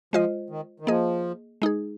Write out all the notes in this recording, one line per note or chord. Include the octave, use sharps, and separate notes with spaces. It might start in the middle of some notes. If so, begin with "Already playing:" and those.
F3 G#3 F4 C5 D#5
D#3
D#3
F3 A#3 G#4 D#5
G#3 D#4 G#4